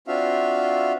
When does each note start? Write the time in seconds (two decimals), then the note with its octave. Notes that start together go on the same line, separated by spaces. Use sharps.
0.08 C4 D4 F4 F#4 E5 F5